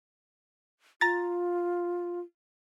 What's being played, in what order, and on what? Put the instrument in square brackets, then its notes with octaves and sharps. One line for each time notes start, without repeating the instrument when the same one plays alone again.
[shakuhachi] F4 [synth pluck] A#5 A6